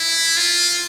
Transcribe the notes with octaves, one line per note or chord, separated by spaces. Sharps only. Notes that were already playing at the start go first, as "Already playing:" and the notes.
Already playing: E4
F4